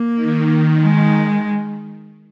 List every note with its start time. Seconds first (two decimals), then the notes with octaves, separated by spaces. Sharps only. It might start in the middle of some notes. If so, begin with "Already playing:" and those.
Already playing: A#3
0.16 D#3
0.80 G#3